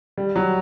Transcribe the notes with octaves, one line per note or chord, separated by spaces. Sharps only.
G3
F#3